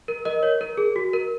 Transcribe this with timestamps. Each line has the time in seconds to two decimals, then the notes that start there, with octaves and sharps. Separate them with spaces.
0.08 A#4
0.25 A#4 D#5
0.43 C#5
0.61 A#4
0.77 G#4
0.96 F#4
1.13 A#4